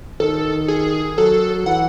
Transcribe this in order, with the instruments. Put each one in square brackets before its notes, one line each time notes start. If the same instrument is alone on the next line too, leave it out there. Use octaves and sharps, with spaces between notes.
[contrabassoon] D#3 [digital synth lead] A4
[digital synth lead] G#4
[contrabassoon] F#3 [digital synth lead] A4
[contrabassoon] E3 [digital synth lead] F#5